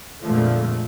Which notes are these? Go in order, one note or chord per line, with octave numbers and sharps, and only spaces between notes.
F2 A#2 D3 F3 G#3 A3